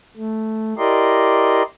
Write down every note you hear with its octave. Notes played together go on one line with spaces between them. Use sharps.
A3
E4 G4 A#4 D5 D#5 C6